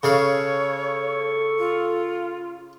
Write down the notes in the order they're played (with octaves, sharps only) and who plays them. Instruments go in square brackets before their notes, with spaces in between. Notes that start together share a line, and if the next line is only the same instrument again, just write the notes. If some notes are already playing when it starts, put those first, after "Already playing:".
[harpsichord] C#3 G#4 F5 [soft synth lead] A4 [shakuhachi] C#5 [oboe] C#6
[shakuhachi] F4